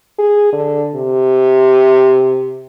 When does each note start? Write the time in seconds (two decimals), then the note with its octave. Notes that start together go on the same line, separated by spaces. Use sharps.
0.18 G#4
0.53 D3
0.95 C3